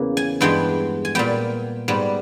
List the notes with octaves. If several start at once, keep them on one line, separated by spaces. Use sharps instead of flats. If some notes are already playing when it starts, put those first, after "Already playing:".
Already playing: E2 C#3 E3 A#3
G#5
G2 E3 G#3 B3 G5
G#5
A#2 G3 B3 G5
G#2 G3 B3